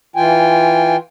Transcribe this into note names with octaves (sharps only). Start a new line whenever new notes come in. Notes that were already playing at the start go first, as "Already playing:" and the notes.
E3 F4 G5 G#5